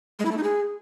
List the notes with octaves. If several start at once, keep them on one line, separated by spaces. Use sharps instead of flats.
G#3
E4
A3
D#4
G#4